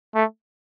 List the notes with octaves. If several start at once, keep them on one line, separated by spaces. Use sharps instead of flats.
A3